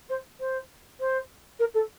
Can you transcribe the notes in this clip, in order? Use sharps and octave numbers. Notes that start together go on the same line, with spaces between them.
C5
C5
C5
A#4
A4